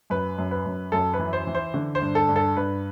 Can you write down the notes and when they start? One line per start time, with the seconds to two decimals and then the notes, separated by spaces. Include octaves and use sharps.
0.10 F#2 B4
0.38 F#2
0.51 B4
0.66 F#2
0.92 F#2 A4
1.14 B4
1.19 E3
1.33 C5
1.47 E3
1.55 C5
1.74 D3
1.95 C5
2.01 G2
2.15 A4
2.29 G2
2.36 A4
2.57 G2 B4